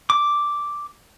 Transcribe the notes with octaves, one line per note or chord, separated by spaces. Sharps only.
D6